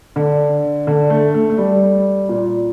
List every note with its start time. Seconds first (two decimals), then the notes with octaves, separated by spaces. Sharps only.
0.16 D3
0.87 D3
1.10 A3
1.34 A3
1.50 A3
1.58 G3
2.29 A#2